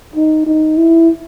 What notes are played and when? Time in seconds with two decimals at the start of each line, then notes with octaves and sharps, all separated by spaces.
0.16 D#4
0.46 D#4
0.78 E4